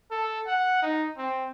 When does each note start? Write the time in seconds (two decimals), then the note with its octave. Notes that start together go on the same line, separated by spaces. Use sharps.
0.11 A4
0.47 F#5
0.82 D#4
1.18 C4